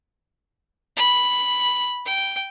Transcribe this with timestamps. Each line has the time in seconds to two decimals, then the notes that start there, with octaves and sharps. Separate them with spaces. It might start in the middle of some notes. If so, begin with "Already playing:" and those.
0.96 B5
2.06 G5